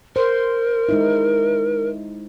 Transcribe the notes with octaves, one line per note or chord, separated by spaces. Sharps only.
A#4 C5
G#3 D#4 E4